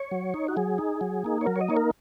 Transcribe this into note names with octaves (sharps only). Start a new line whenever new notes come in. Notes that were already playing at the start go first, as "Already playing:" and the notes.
Already playing: C#5
F#3
D#4
F#4
F#3 G#4
D#4
F#3
A#3 D#4
C#5
F#3 A#4
C#5
D#5
A#3 D#4 C#5
A#4